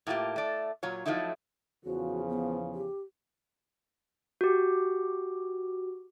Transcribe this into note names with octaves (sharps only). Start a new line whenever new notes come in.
A2 A#3 F4 G4
A3 D5
A#2 F#3 F4 C#5
F3 F#3 A3 D#4 E4
E2 C#3 F3 F#4
B3
G4
F#4 G4